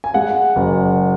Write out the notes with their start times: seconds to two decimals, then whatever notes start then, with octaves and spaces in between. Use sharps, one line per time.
0.04 G#5
0.14 G#3 F#5
0.56 F#1